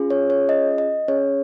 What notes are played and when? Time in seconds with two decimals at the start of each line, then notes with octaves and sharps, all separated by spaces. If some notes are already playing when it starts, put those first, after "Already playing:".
Already playing: C#4 F4 G#4
0.10 C#5
0.30 C#5
0.49 D#5
0.78 D#5
1.08 C#4 G#4 C#5